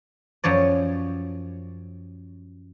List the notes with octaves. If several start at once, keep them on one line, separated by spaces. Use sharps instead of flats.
F#2 F3 C#5 D5